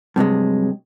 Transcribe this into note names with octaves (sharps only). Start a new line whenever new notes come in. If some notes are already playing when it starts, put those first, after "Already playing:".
G2 C3 F#3 G#3